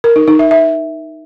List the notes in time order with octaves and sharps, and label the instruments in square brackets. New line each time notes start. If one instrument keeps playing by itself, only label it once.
[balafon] A#4
D#4
D#4
E5
E5